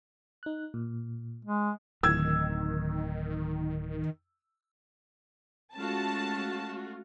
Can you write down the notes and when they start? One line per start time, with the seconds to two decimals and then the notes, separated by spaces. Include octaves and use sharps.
0.43 D#4 F#6
0.74 A#2
1.45 G#3
2.03 D1 D#3 E6 G#6
5.77 G#3 A3 C#4 F4 F#4 A5